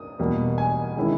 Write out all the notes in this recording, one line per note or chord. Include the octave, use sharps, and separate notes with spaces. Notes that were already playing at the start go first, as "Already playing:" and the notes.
Already playing: D#6
E2 B2 G3 A#3
G#5
D#3 G#3 C#4 E4